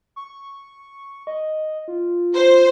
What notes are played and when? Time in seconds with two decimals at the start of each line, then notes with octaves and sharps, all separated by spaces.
0.16 C#6
1.27 D#5
1.88 F4
2.35 C5